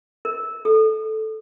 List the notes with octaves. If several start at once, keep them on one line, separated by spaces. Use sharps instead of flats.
A#4
A4